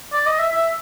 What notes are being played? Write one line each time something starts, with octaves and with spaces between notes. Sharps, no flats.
D5
D#5
E5
E5